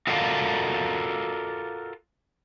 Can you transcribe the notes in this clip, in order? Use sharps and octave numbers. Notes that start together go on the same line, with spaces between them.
F4 F#4 A4 A#4 D5 F5